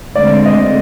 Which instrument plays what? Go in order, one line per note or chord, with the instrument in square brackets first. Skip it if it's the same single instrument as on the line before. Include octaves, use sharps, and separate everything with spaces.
[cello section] D2 D3 G#3 C4 [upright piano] D5
[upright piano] D#5